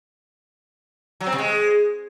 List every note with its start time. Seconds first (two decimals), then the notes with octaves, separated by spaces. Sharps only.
1.21 F#3
1.26 C4
1.32 C3
1.38 G#3